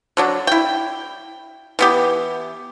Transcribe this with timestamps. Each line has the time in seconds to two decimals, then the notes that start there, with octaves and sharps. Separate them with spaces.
0.17 D3 F#3 D4
0.47 E4 G5
1.79 E3 B3 G4